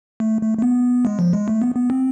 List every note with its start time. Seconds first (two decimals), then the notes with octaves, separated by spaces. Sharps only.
0.20 A3
0.42 A3
0.58 A3
0.62 B3
1.05 G#3
1.19 F3
1.33 G#3
1.48 A3
1.62 B3
1.76 B3
1.90 C4